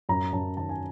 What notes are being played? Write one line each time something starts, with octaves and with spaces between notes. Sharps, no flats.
F#2 A#5
F#2 A5
D#3 A5
G#5